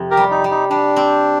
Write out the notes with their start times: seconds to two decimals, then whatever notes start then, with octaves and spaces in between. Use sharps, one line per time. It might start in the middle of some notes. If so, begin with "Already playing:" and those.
Already playing: F2 C3
0.11 G4 A#4
0.17 G3
0.31 D#4
0.44 G3
0.51 D#4
0.70 G3 D4
0.96 C4